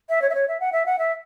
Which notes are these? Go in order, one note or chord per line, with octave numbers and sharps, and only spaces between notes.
E5
C#5
E5
C#5
E5
F#5
E5
F#5
E5